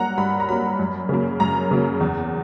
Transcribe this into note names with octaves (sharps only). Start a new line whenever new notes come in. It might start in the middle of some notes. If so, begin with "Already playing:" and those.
Already playing: G2 F#3 A#3 F#5 A#5
G2 B5
A#5
F#3 A#3 B5
F#2
C#3 F#3 A#3
F#2 A#5
C#3 F#3 A#3
E2